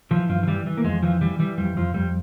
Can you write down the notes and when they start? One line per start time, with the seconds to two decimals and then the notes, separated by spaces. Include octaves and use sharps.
0.11 E3 F3
0.29 G2 F3
0.43 F3
0.47 E3 G3
0.66 E3
0.77 A#3
0.84 F2 G#3
1.03 E3 F3
1.21 E3 G3
1.39 E3 G3
1.58 F2 G3
1.76 F2 F3
1.94 F2 G3